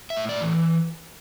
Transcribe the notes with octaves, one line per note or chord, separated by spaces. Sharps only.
E5
A2
D5
E3